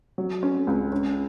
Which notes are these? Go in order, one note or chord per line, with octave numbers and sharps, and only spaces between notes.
F#3
C#4
C#2
C#4